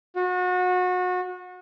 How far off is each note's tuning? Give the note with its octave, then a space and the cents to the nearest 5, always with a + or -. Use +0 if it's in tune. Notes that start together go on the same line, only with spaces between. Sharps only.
F#4 -30